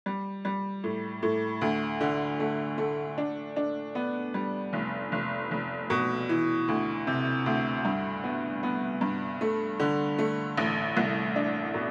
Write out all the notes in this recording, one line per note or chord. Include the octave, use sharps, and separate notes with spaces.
G3
G3
A2
A2
D2
D3
A3
A3
D4
D4
B3
G3
F1
F1
F1
B2
E3
D2
C3
D2
G2
B3
B3
G2
A3
D3
A3
A1
C2
D4
B2